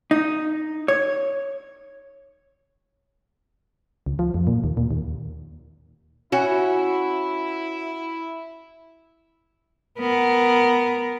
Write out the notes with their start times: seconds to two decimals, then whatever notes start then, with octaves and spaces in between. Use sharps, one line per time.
0.11 D#4
0.88 C#5
4.06 C#2
4.19 F3
4.34 F2
4.47 A#2
4.64 D#2
4.77 A#2
4.91 D#2
6.32 C#4 E4 F#4
9.99 B3 A#4